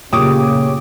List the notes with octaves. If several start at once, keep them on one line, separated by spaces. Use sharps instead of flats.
A#2 C#3 G4 C#5 D6 D#6